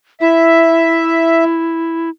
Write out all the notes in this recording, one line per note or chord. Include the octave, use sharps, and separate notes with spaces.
E4 E5